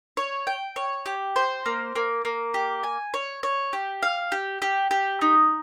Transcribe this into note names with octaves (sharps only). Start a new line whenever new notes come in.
C#5
G5
C#5
G4
C5
A#3
A#3
A#3
G4
G#5
C#5
C#5
G4
F5
G4
G4
G4
D#4